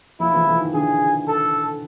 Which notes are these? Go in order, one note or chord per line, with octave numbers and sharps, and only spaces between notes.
F3 E4
E3
E3
D#3
D3 G#4
A4